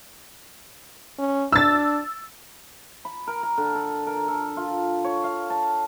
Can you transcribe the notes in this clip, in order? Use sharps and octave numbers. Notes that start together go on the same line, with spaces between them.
C#4
D4 E6 A6
B5
A#4
A#4
D3
A4
A#4
A4
F4
C#5
F5
A5